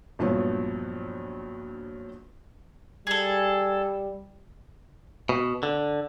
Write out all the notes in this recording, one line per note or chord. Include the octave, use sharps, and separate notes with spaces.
A#1 G2 F3 F#3 B3
G3 G#4 A4
B2
D3